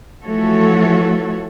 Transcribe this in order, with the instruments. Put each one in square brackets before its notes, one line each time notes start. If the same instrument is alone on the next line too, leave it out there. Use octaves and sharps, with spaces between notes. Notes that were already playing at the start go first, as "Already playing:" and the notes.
[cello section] E3 F3 A3 F#4 A4 C#5